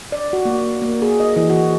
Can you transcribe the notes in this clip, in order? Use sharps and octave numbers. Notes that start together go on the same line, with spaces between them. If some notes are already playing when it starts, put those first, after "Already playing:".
D5
F#4
A#3
A#3
G#4
D#5
E3
F#4